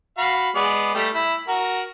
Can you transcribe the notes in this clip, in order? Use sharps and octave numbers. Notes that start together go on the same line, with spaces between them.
F#4 F5 B5
G#3 B3 D5
G3 A3 G4
E4
F#4 A#4